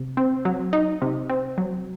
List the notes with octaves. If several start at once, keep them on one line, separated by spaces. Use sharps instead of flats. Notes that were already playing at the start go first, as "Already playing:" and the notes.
Already playing: C3
C4
F#3
D#4
C3
C4
F#3